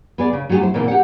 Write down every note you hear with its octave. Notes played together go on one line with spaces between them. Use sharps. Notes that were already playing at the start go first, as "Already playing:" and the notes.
B3 G#4 D5
C#3
F#3 A3 B3 G4 G#4
E4 C5
A#2 C#3 E3 B3 C4
G4 G#4 F#5